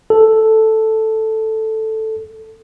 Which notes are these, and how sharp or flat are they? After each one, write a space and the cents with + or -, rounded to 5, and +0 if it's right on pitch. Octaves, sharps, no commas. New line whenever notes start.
A4 +0